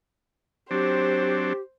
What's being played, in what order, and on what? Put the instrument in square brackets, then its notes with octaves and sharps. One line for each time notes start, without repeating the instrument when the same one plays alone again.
[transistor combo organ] F#3 C4 D4 [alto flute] G4 [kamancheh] C5